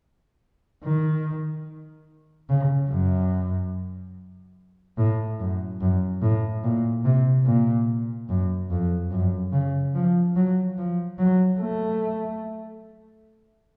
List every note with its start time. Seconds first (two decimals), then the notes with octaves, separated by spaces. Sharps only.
0.84 D#3
2.49 C#3
2.90 F#2
4.97 A2
5.40 F#2
5.81 F#2
6.22 A2
6.64 A#2
7.05 C3
7.46 A#2
8.29 F#2
8.71 F2
9.11 F#2
9.53 C#3
9.94 F3
10.36 F#3
10.78 F3
11.19 F#3
11.60 A3